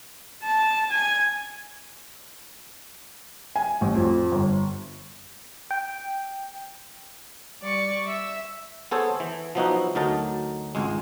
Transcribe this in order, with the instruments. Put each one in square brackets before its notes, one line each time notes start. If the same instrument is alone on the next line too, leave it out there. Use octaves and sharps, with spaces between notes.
[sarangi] A5
G#5
[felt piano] G#5
A1
F2
G1
[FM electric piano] G5
[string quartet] G3 D5 C#6
E5 E6
[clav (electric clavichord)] B3 G#4 A4 C5 C#5
E3
F3 F#3 B3 D#4 E4 F#4
D2 F#3 D#4 A#4 A5
G#1 C#2 G#3